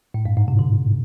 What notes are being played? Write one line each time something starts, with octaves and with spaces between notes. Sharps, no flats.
A2
G2
G#2
C3
D3